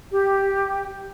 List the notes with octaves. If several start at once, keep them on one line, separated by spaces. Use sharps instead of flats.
G4